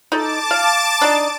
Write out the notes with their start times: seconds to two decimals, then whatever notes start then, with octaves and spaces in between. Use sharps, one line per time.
0.12 D#4 A4 A5 D6 A6
0.51 F5
1.01 D4 D#4 A5